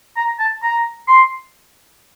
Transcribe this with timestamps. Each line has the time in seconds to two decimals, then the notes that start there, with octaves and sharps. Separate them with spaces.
0.16 A#5
0.39 A5
0.62 A#5
1.08 C6